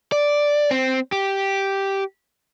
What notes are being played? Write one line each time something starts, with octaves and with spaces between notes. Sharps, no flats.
D5
C4
G4